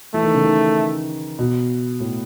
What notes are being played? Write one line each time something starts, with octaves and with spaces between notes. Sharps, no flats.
E3 A3
D#3
C#3
D#3
B2
A2